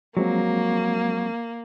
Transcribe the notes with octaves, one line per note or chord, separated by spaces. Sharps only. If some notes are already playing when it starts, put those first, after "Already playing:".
F3 F#3 G#3 A#3 C4